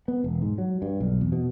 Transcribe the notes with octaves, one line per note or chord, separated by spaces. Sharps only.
B3
E1
G#2
F#3
G2
B1
E2
B2